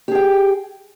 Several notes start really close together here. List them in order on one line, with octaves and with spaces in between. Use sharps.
G4 G#4 G5